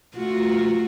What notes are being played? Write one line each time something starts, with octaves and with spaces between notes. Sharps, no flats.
A3 F4 F#4